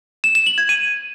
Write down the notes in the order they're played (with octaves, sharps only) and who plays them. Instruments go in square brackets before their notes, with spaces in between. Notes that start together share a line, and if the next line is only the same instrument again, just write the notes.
[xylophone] E7
E7
F#7
G#6
D#7